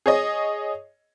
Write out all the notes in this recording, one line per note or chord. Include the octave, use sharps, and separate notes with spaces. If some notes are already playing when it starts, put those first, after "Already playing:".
G#4 C#5 D#5